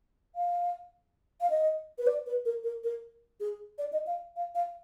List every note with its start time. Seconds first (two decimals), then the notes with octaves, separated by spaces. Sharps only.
0.35 F5
1.41 F5
1.50 D#5
1.98 B4
2.07 D5
2.26 B4
2.45 A#4
2.64 A#4
2.84 A#4
3.40 G#4
3.78 D5
3.93 D#5
4.07 F5
4.36 F5
4.55 F5